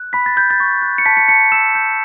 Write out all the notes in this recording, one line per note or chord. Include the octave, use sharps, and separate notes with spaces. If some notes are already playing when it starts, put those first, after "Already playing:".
Already playing: F#6
B5 B6
A6
B5 G6
A6
C#6
F#6
C#7
A5 B6
C#7
A5 C#7
E6 E7
G6